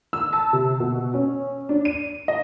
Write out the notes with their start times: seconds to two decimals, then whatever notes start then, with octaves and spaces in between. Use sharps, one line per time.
0.13 E6
0.33 A5
0.53 C3
0.80 B2
1.14 C#4
1.69 D4
1.85 D#7
2.28 D#5